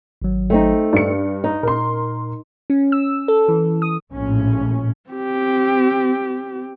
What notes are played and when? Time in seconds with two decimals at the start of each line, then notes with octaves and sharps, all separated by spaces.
0.22 G#1 F#3
0.50 A3 C4 D#4
0.93 G2 D5 C#7
1.44 D#4
1.63 A#2 A#4 C6
2.70 C#4
2.92 E6
3.28 A4
3.48 E3
3.82 D#6
4.13 A#1 A2 C#4
5.10 C4 G4